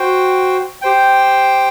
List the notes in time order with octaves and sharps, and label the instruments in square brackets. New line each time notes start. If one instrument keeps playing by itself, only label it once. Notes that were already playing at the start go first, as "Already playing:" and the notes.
Already playing: [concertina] F#4 C5 G5
G4 C5 G5